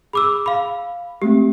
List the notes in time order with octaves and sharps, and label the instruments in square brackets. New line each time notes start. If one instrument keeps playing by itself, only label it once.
[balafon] G#4 [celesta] B5 D6 E6
[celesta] F5 B5
[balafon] G#3 A3 C4 [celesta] G4